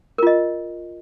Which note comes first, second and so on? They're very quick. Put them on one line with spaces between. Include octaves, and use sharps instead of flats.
A#4 F4 D#5